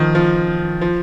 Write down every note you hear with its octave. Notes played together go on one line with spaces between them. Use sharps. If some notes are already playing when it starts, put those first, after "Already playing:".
Already playing: D#3 F3
F3
F3